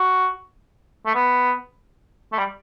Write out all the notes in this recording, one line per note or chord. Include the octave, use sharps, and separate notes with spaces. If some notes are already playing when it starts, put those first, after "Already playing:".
Already playing: F#4
A3
B3
A3
G3